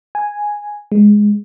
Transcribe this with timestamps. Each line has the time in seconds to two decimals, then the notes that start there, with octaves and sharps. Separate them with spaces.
0.15 G#5
0.92 G#3